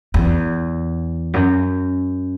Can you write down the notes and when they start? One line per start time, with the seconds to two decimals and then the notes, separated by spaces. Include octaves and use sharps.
0.14 E2
1.34 F#2